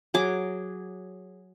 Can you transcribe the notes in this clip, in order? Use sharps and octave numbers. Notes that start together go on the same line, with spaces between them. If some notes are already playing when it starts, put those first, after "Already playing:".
F#3 G#4 D6